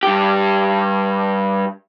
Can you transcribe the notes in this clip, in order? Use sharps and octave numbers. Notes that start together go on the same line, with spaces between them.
G2 G4